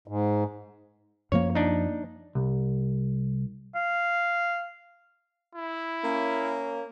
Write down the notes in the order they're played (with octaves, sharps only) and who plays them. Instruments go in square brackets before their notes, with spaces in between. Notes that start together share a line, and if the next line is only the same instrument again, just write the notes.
[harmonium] G#2
[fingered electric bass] F#2 F3 A#3 [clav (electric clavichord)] C#5
[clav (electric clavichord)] D4 D#4
[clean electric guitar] C2
[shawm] F5
[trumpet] E4
[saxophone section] A#3 C#4